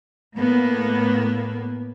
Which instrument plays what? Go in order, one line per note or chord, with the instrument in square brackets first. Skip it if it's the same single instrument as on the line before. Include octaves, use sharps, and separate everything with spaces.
[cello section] A2 A#3 B3